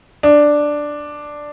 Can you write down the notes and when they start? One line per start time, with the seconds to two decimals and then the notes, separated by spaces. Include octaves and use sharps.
0.23 D4